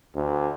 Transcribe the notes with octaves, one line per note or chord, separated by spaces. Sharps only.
D2